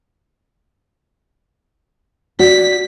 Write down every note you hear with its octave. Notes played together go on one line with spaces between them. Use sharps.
F#4 D5 B6